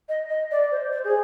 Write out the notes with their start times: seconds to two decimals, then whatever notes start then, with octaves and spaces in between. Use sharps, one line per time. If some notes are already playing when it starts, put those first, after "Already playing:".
0.09 D#5
0.29 D#5
0.51 D5
0.71 C5
0.92 C5
1.04 G#4